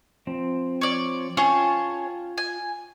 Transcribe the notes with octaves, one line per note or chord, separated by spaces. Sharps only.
F3 C4
C#5 D5
C#4 F4 G#4 C#5 G5 A5
G#5